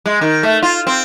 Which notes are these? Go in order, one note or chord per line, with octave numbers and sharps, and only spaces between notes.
G#3
D#3
A3
F4
C4